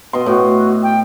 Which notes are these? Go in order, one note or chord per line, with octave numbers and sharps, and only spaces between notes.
B2 D#5 C6
A2 F#4
G5